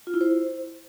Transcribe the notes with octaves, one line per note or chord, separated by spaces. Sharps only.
F4
E4
C5